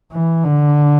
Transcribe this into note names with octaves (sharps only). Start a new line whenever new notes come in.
E3
D3